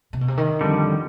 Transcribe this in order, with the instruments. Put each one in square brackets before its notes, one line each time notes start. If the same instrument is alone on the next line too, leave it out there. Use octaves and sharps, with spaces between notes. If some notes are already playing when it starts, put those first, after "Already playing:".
[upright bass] C3
B2
C3
D#3
[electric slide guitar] F2 D3 G3